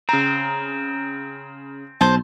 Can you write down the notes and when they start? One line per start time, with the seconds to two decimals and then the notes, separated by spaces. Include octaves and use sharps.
0.09 C#3 C4 A#5
2.01 B1 C5 A5